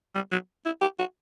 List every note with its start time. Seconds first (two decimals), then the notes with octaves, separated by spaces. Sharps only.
0.15 G3
0.32 F#3
0.65 E4
0.81 G4
0.99 F#4